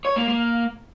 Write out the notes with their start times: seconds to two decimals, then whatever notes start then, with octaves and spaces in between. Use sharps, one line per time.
0.05 C#5
0.16 A#3
0.28 A#3